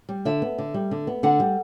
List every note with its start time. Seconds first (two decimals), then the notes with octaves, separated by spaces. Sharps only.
0.09 G3
0.25 D3 E5
0.42 B3
0.58 D3
0.74 G3
0.91 D3
1.07 B3
1.23 D3 F#5
1.40 G3